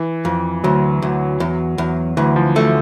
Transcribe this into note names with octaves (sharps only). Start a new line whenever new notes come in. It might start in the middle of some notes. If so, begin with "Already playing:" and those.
Already playing: E3
F2
D2 F#3
D2
E2
E2
D2 E3
F3
A3